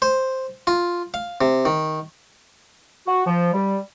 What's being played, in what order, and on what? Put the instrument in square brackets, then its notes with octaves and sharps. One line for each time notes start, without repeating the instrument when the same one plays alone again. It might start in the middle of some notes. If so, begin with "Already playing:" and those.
[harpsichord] C5
F4
F5
C3
D#3
[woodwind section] F#4
F3
G3